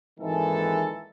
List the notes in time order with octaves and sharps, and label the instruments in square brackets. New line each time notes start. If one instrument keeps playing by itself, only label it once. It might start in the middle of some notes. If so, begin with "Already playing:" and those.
[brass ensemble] G#1 A#2 D#3 E3 G#3 A4